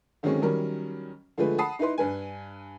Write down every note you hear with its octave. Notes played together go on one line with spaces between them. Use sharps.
D3 D#3 F#3 G#3 C4 C#4
D#3 F#3 G3 C#4 A#4
D3 F3 G#3 A3 B4
F#5 A5 B5 D#6 C7
D#4 E4 B4 C6
G2 B4 G#5